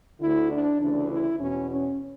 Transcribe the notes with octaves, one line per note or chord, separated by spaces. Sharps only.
D2 D3 E4
D4
D2 C#3 E3 D4
E4
E2 B2 C#4
C#4